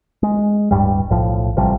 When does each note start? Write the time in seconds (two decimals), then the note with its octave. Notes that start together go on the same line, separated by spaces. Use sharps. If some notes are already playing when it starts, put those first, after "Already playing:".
0.23 G#3
0.71 D1 G2 G3
1.10 B1 A2 F3
1.57 A1 C3 F3 G3